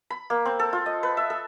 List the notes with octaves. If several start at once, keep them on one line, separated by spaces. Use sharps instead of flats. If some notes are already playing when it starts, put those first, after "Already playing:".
B5
A#3
C4
A4
F4
D#5
B4
E5
A4